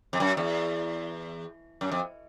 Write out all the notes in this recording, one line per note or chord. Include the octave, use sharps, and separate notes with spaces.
F2
F#2
E2
F#2
F2